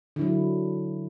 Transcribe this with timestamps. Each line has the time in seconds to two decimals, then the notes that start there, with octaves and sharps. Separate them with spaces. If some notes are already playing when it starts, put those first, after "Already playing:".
0.16 D3
0.19 E4
0.21 F#3